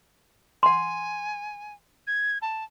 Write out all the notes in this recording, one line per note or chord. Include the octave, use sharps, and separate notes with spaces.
F#5 G#5 C6
G#6
A5